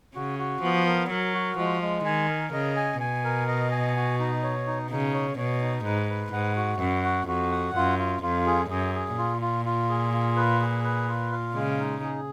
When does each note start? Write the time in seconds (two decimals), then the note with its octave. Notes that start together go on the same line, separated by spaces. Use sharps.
0.15 C#3 F#4
0.39 F#4
0.63 F3 B3
0.87 A#4
1.10 F#3 A#4
1.34 F#4
1.58 F3 G#3
1.82 G#3
2.05 D#3 G#5
2.29 A#4
2.53 C#3 D#5
2.76 G#5
3.00 B2 G#5
3.24 A#4
3.48 D#5
3.71 G#5
3.96 F#4
4.19 D#4
4.43 C#5
4.67 D#4
4.91 C#3 D#4
5.14 C#5
5.38 B2 C#5
5.61 D#4
5.85 G#2 B4
6.09 B4
6.33 G#2 F#5
6.56 F#4
6.80 F#2 F#5
7.04 F#4
7.28 F2 F#4
7.52 F#5
7.76 F#2 F4
7.99 F4
8.23 F2 F4
8.46 G#4
8.70 F#2 G#4
8.95 G#4
9.18 A#2 F4
9.42 F4
9.65 F4
9.89 G#4
10.13 F4
10.37 B4
10.60 G#4
10.84 B4
11.08 F4
11.32 F5
11.55 C#3 G#3
11.79 D#4
12.03 G#4